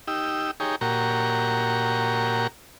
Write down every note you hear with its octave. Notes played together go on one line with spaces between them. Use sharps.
D#4 G4 E6
D#4 G4 G#4 C#5 A#5
A#2 F#4 G4 A#4 A#5 C#6